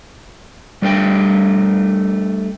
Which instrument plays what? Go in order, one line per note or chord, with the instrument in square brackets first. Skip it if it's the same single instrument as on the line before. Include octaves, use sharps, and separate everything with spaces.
[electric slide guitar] G3 A3 D4 F5 G5